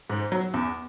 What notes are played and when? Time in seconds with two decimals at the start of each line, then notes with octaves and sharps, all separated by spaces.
0.10 G#2
0.32 F#3
0.54 E2